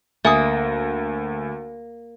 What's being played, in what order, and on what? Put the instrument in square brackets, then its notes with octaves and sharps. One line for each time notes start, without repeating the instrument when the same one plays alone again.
[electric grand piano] D2 [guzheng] A#3 [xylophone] E5 G#5 D#6